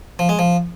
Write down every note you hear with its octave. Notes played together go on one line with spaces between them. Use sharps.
F3
G#3
F3